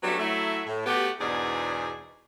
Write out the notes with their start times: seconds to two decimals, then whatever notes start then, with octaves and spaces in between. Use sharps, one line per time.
0.03 F#3 G3 A3 B3 C#4 D4
0.19 F#3 A3 E4
0.67 A2
0.86 A3 B3 F#4 G4
1.20 E2 G#2 B2 D4 G#4 D5